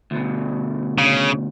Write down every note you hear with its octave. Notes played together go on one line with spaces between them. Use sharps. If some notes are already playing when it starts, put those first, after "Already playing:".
D2 B2
C#3